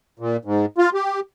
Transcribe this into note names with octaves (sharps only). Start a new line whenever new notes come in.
A#2
G#2
F4
G4